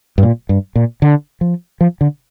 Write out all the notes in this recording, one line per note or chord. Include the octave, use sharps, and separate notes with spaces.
G2
A#2
G2
A#2
D3
F3
F3
D3